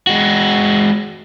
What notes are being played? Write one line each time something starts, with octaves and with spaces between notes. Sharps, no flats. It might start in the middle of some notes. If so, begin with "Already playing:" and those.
G#3 F#4